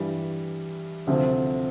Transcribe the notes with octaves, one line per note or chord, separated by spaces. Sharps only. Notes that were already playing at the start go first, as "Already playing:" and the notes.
Already playing: G2 E3 G3
D2 C3 F3 C4